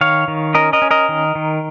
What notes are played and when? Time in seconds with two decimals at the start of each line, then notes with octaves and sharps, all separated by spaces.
0.01 D#3 C#5 F5
0.28 D#3
0.54 C#4 A#4 D#5
0.73 A#4 D#5
0.82 C#4
0.91 A#4 D#5
1.09 D#3
1.35 D#3